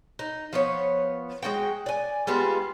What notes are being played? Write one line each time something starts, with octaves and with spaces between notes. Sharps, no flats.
D#4
F3 B3 C#5
G#3 E4 F#4 G5
D5 G#5
G3 G#3 B3 F4